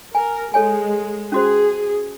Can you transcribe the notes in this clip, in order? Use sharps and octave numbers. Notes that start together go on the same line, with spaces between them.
A#4 G#5
G#3 A4 C#5 G#5
C#4 F#4 G#4 C5